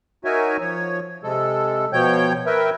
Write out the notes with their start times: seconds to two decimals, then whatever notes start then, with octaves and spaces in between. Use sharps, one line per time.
0.25 D#4 F#4 A#4 C#5 E5 G#5
0.60 F3 C#5
1.23 C3 G#3 A4
1.93 B2 F3 C#5 G5 G6
2.46 A#4 B4 E5 G5